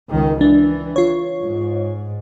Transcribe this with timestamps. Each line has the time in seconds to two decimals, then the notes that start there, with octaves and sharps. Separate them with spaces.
0.10 C#2 D#3
0.41 E3 D4
0.96 F4 C#5
1.42 G#2